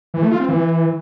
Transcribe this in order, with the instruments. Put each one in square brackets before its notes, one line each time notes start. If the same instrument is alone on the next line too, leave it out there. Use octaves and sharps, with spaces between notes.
[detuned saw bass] E3
A3
F4
C4
E3